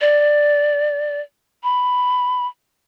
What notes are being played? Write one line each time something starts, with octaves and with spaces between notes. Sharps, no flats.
D5
B5